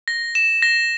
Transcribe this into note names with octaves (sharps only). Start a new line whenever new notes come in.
A#6
E7
A#6